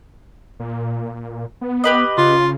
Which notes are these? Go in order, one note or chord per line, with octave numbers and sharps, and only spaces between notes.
A#2
B3
G4 B4 D#5
C#3 F4